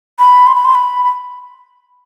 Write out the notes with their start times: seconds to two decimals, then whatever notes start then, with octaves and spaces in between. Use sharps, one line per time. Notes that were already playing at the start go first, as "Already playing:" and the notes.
0.19 B5
0.47 C6
0.55 B5
0.65 C6
0.75 B5
1.03 B5